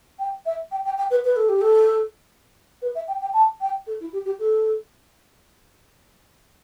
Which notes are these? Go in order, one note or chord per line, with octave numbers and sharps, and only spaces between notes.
G5
E5
G5
G5
G5
B4
B4
A4
G4
A4
B4
E5
G5
G5
A5
G5
A4
E4
G4
G4
A4